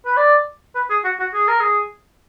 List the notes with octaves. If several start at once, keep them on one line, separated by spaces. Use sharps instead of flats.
B4
D5
B4
G#4
F#4
F#4
G#4
A#4
G#4